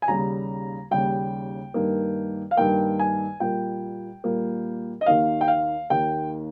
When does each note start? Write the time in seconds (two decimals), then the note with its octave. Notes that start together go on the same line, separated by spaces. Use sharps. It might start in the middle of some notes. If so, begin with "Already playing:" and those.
0.02 G#5
0.08 D#2 C#3 G3 A#5
0.91 D#2 C#3 G3 G5
1.74 G2 D#3 A#3
2.51 F5
2.57 G2 D#3 A#3 G5
2.99 G#5
3.40 A#2 G3 A#3 G5
4.24 A#2 G3 A#3
5.01 D#5
5.06 D#2 D#3 A#3 F5
5.41 G5
5.48 F5
5.90 D#2 D#3 A#3 G5